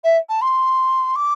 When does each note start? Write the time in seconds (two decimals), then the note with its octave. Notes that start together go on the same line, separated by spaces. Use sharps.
0.04 E5
0.29 A5
0.41 C6
1.16 D6